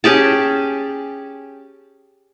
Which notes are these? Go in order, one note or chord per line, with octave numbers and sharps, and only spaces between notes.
C#4 G4 G#4 A5